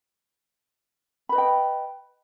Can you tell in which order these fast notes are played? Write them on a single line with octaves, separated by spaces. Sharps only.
B5 B4 D#5 G5